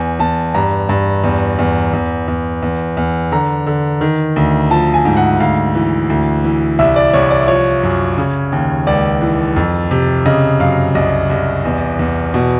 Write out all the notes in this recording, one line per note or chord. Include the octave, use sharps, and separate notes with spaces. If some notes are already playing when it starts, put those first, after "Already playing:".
Already playing: E2 G#5
E2 A5
G2 A#5
G2
E2
E2
E2
E2
E2
E2
D3 A#5
D3
D#3
D2
F3 A5
G#5
G#2
F#5
D2 F5
E3
D2
E3
C2 E5
D5
C2 C#5
D5
F3 C#5
F#2
C#3
D#2
C#2 D5
E3
F2
C3
C#3 D#5
F#2 F5
C2 D#5
C2
E2
E2
B2